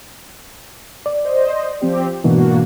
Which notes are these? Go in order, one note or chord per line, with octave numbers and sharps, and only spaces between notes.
D5
C5 D#5
F3 C4 G4
G#2 B2 E3 A#3 D4 F#4